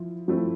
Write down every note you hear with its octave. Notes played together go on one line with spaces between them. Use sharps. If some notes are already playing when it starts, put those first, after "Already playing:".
Already playing: F3 E4
F3 A3 C4 E4